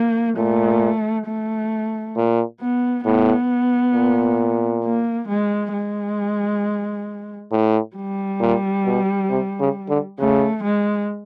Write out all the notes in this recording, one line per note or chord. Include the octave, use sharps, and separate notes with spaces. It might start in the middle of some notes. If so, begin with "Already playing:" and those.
Already playing: A#3
A#2 A3
A3
A#2
B3
A2 B3
A#2
A#3
G#3
G#3
A2
G3
A#2
B2
C3
C#3
D3
C#3 A3
G#3